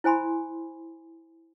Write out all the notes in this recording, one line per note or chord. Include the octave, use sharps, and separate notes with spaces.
E4 C5 G#5 B5 C6